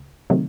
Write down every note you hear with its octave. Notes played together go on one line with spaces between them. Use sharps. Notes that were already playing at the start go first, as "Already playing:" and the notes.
Already playing: C#2
C3 D#3 F#3 A3